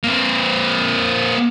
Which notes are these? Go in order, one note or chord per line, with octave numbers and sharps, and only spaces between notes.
A#3 C4